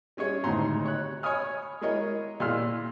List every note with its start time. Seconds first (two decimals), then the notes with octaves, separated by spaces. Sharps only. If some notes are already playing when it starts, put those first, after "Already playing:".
0.17 G3 C#4 G#4 C#5
0.44 G#1 D2 A2 C3 A#5 C6
0.86 C#5 F#6
1.23 C#5 G#5 B5 D#6 F6
1.81 G#3 E4 G#4 A#4 C#5 D#5
2.40 A#2 E4 G#4 C6 E6 F6